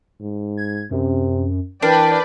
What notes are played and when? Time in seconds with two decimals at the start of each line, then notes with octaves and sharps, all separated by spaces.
0.21 G#2
0.57 G#6
0.91 F#2 C3
1.82 E3 D4 A#4 B4 D5 G5